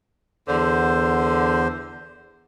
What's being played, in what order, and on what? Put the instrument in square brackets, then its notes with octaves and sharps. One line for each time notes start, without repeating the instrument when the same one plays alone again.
[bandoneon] E2 C5 [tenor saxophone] D3